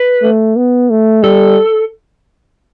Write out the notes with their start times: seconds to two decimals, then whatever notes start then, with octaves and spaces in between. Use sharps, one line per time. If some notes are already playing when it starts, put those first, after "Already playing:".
Already playing: B4
0.22 A3
0.56 B3
0.90 A3
1.23 G3 A4